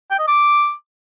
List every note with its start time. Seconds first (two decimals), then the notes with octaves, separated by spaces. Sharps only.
0.11 G5
0.19 D#5
0.28 D6